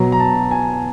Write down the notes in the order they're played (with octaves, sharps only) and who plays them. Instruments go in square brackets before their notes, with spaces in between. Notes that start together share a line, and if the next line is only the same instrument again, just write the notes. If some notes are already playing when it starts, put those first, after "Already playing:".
Already playing: [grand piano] B2 F#3 A#5
A#5
A5
G#5